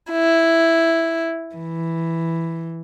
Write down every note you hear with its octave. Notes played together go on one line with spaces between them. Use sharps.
E4
E3